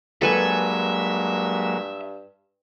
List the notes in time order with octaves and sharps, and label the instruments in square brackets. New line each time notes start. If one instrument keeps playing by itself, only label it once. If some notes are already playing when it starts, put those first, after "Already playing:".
[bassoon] G2 [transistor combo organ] F#3 G#3 A#3 [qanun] A4 B4 G#5 [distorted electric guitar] E5